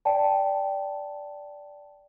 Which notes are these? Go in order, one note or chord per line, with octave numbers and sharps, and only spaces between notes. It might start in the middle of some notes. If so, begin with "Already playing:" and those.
D5 G5 A5